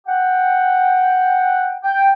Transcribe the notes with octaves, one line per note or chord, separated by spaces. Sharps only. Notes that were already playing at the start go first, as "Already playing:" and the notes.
F#5 G5
G5